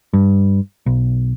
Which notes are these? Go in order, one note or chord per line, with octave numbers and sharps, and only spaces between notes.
G2
B1